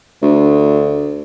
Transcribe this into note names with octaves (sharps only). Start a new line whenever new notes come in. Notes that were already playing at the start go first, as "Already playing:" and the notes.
D2